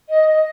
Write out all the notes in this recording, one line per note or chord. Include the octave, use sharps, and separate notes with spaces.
D#5